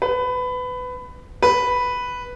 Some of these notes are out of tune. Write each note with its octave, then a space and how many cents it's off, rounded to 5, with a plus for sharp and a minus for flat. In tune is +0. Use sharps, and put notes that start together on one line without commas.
B4 +20
B4 +0